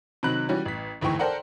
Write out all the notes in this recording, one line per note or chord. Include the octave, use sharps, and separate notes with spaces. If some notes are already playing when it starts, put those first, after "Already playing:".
C3 D#3 F#3 B5 F#6 F#7
E3 G3 C#4 F#4
A1 B6
G#1 D2 E3 G5 C#6
A4 A#4 C5 D5 F#5 G5